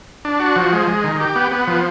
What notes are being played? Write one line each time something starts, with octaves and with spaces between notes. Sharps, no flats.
D4
F#4
F3
G#3
G#3
D#3
G4
B3
B3
F3